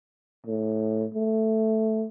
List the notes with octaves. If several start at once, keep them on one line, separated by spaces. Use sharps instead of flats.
A2
A3